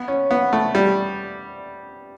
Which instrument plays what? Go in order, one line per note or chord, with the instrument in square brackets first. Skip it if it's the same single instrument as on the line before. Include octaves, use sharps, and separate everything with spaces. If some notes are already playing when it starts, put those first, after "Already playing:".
Already playing: [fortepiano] B3
C#4
B3
A3
G3